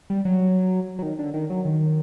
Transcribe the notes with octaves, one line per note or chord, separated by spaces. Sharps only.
G3
F#3
F#3
D#3
D3
D#3
F#3
D#3